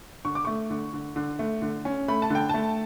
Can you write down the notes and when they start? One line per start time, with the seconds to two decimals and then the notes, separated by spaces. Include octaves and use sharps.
0.25 D3 C#6
0.35 D6
0.45 A3 C#6
0.70 D3
0.93 D3
1.16 D3
1.39 A3
1.62 D3
1.85 C#4
2.08 A3 B5
2.22 A5
2.30 D3 G5
2.49 A3 A5